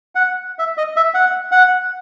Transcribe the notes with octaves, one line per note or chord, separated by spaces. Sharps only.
F#5
E5
D#5
E5
F#5
F#5